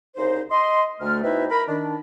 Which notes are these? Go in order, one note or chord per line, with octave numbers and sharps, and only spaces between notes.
C2 C#3 D#4 C5
D#5 C6
D2 A3 F6
B2 C4 D#4 E4 B4 E5
A#4 B5
D#3 D4